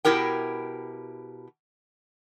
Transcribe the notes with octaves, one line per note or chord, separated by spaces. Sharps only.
B2 E4 G4 A#4 G5